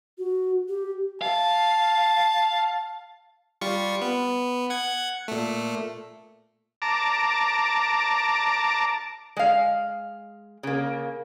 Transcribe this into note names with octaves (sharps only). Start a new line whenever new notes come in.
F#4
G4
F5 A5
G3 F4 C#6
B3
F#5 G#6
A#2 A3
A5 A#5 D6
G#3 F5
C#3 A#3